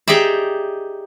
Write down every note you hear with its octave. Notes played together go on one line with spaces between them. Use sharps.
D#4 G4 G#4 D5 E5